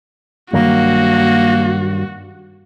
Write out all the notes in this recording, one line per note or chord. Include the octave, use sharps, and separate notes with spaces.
G2 D#3 F#3 A#3 F#4